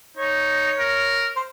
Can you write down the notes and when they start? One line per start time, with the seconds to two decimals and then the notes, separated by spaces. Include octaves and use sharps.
0.17 D#4 C#5
0.79 A#4
1.36 C5